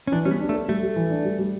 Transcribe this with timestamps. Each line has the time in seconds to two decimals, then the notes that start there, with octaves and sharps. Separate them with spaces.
0.07 C#4
0.12 E3 D4
0.25 G3 C#4
0.31 B3
0.40 D4
0.49 A3
0.54 A4
0.68 G3 A3
0.83 G3
0.96 E3
1.10 D4
1.25 G3
1.39 G3